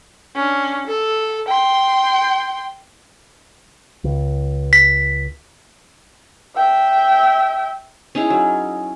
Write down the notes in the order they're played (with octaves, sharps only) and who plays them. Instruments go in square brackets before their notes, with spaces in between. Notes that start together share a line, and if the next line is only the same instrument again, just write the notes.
[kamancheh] C#4 D4
A4
G5 C6
[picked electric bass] C#2
[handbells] B6
[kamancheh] E5 G5
[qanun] C#4 D#4 E4 G#4
F#3